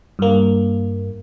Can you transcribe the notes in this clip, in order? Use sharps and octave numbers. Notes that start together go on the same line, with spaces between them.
G2 A#3